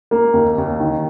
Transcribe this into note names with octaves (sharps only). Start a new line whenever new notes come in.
A#3
D#2
D#2
D#3